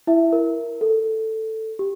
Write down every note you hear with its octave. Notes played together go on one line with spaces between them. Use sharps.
E4 E5
A#4
A4
G4